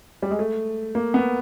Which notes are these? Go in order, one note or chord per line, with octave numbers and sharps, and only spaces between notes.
G3
G#3
A3
A#3
B3